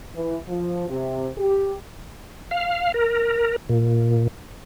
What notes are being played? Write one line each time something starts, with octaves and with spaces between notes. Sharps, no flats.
E3
F3
C3
G4
F5
A#4
A#2